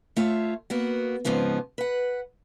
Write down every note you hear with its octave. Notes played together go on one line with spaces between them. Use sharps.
A3 F4 C#5 E5
A#3 B3 F#4
G#2 C#3 F3 B3 C4
B4 F#5